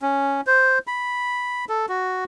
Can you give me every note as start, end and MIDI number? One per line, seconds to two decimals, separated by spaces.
0.02 0.41 61
0.47 0.79 72
0.87 1.65 83
1.69 1.86 69
1.89 2.24 66